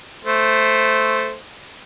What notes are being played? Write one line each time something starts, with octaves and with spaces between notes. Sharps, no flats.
A3 C5